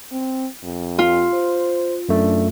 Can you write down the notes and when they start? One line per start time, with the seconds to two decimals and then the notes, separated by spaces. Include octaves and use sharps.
0.12 C4
0.63 F2
0.99 F4
1.34 C5
2.09 F#2 A3 D4